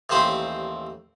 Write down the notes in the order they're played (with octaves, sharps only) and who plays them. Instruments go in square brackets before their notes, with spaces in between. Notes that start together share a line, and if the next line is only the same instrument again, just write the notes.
[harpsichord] A1 D#2 C4 C5 B5